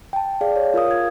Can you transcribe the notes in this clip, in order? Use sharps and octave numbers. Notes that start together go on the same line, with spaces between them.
G5 A5
G#4 D5 F5
C#5
F4 A#4 F5 D#6
G#6